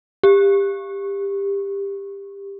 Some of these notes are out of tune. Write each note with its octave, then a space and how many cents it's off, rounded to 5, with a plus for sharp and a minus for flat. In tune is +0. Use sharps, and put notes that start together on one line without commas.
G4 +20